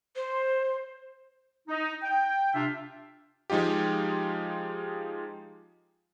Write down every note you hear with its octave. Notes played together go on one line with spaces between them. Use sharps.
C5
D#4
G5
C3 D4 F4 E5
F3 G#3 D#4 F4 G4